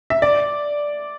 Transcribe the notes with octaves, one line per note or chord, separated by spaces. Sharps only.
E5
D5